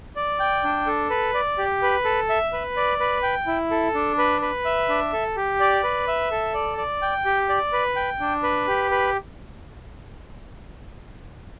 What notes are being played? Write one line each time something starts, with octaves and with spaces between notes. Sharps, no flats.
D5
G5
D4
A4
B4
D5
G4
B4
A4
E5
B4
D5
B4
G5
E4
A4
D4
B4
B4
E5
D4
A4
G4
D5
B4
E5
A4
D5
D5
G5
G4
D5
B4
G5
D4
B4
G4
B4